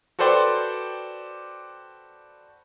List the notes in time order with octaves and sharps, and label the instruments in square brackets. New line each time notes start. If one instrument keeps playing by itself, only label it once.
[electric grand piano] F#4 A4 B4 C5 D5 G5